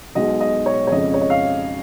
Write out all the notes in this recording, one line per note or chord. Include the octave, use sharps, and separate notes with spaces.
B1 B2 G#3 D#5
D#5
C#5
C#5
F2 C#3 G#3 D#5
C#5
D#5
F5